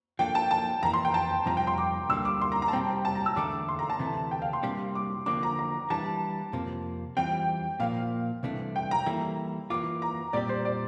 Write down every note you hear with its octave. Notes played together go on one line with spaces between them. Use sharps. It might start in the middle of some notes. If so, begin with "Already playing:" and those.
F3 A#3 D4 A4 G5
A5
A5
F2 E3 A#3 A#5
C6
G5
A5
F2 C3 G3 C4 F4 A#5
G5
C6
D6
D2 D3 G3 A#3 E6
D6
C6
A#5
A#5
A5
C3 G3 C4 G5
A5
A#5
E6
E2 D3 A3 D4 A4 D6
C6
A#5
A5
D2 C3 E3 A3
G5
F5
C6
C3 G3 A#3 D4 G4
D6
D3 F3 A#3 D4 D6
A#5
A#5
E3 G3 D4 A5
F2 C3 F3 A#3
E2 E3 G3 C4 F4 G5
A#2 F3 A#3 F5
C2 C3 E3 A3 D4
G5
A#5
E3 G3 A#3 E4 A4
E3 A#3 F4 D6
A#5
A#2 G3 C4 G4 D5
C5
D5